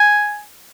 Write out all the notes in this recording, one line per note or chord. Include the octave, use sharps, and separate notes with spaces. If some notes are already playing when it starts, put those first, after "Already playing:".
Already playing: G#5